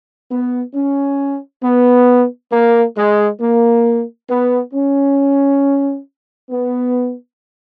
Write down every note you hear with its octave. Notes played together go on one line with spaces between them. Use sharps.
B3
C#4
B3
A#3
G#3
A#3
B3
C#4
B3